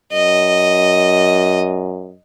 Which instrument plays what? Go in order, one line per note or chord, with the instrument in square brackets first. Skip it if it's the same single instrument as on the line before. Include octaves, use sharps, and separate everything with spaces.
[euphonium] F#2 [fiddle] D#5